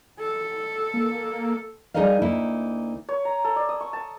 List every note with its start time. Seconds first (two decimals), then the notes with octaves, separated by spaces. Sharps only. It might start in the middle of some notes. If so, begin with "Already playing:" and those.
0.20 A4
0.94 A#3
1.94 G3 D#4 G#4 A#4 D#5 F5
2.22 D2 A#3 D#4 E4
3.09 C#5
3.25 A#5
3.44 A4
3.56 D5
3.69 D#6
3.81 C#6
3.93 A5